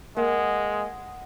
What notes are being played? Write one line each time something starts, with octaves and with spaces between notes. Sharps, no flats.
G#3 A#3 F#5